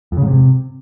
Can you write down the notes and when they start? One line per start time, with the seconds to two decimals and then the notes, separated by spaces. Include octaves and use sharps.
0.12 F2
0.17 C#3
0.22 G#2
0.27 C3